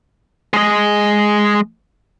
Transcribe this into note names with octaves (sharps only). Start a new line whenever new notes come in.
G#3 D#5